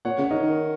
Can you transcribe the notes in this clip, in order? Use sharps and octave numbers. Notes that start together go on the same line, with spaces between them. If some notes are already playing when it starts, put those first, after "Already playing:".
A#2 C#5 F#5
C#3
C#5
D#3 A#4 D#5
D#3